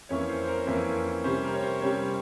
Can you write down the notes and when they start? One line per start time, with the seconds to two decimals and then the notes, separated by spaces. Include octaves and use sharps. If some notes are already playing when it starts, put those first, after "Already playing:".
0.09 F2 E3 A#3 C#4 C#5
0.29 C5
0.42 C5
0.48 A#4
0.67 F2 E3 A#3 C#4
1.24 C3 G3 C#4 C5
1.44 A#4
1.54 C#5
1.63 C5
1.81 C3 G3 C#4 C#5